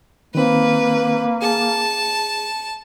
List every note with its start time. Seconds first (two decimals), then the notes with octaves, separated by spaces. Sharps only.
0.35 D#3 A#3 C4 B4
1.42 G#4 A5